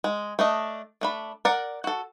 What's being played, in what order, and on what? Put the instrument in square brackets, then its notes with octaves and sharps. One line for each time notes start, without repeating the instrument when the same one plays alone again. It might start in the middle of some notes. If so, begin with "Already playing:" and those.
[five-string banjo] G#3
A3 D4 D#5
A3 D4 B5
A#4 D5 F#5
F#4 A4